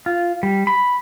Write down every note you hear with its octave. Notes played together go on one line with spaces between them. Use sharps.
F4
G3
B5